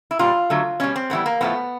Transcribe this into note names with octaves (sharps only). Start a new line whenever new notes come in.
E4
A#2 G3 F4
D3 F#3 A3
B2 G3 C#4
C4
A2 E3 G3 B3
A#3
A2 F3 A3 B3